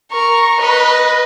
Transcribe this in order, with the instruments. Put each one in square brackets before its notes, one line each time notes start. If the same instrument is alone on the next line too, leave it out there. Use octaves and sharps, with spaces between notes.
[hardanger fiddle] A#4 [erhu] C#6
[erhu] B4 [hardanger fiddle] D#5 B5